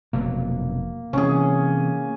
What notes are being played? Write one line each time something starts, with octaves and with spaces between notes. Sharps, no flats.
F1 B2 F#3 A#3
C3 E3 C#4 G#4